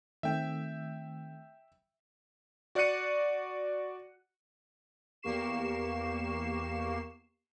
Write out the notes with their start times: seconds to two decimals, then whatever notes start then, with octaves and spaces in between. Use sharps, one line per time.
0.23 D#3 A3 C4 E5 G5
2.75 F#4 D5 F#5 F#6 C#7 D#7
5.22 E2 A#3 G4 C#6 C7 E7